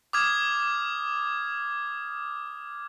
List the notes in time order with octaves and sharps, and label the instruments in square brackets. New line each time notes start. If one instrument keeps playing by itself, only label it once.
[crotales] D6 D#6 F6 G#6